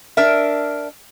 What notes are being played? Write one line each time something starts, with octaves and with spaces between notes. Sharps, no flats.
D4 A#4 E5